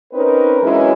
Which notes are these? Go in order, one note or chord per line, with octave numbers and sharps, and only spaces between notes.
C4 C#4 D#4 A#4 B4
E3 F#3 G#3 C#4 D#4 E4